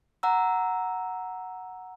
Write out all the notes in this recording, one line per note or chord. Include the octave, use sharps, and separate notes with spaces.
F#5 A#5 E6